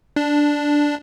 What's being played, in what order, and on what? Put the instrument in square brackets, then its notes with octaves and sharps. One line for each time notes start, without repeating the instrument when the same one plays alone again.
[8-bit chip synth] D4